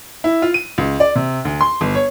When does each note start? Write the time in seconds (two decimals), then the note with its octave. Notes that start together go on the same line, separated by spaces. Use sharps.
0.24 E4
0.42 F4
0.54 D#7
0.78 C#2
1.00 D5
1.15 C3
1.45 D2
1.61 C6
1.81 G1
1.95 C#5